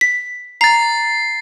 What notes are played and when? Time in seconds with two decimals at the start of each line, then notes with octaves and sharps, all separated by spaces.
0.01 B6
0.61 A#5 A6 C7